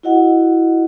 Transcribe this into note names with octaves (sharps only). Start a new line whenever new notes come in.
E4 F#4 D#5 F#5